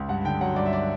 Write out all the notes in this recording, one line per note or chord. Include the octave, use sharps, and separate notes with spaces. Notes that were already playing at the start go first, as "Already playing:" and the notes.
Already playing: C#2
G2 F#5
D3 G5
F#3 F#5
G2 D5
E5
D5